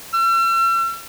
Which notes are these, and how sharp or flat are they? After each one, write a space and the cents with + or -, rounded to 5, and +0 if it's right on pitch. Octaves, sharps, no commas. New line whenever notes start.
E6 +45